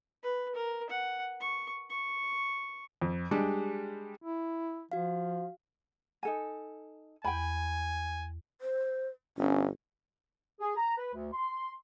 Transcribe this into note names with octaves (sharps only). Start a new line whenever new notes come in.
B4
A#4
F#5
C#6
C#6
F2
G3 G#3 D4 G4
E4
F3 F#4 F5
D#4 A4 G#5
E2 G5 G#5 B5
C5
G1 C#4
G#4
A#5
B4
D2
C6